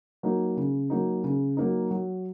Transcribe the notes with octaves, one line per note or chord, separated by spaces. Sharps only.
F#3 A#3 D#4
C#3
F#3 A#3 D#4
C#3
F#3 A#3 D#4
F#3